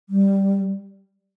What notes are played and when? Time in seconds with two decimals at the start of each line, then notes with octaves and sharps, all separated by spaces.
0.09 G3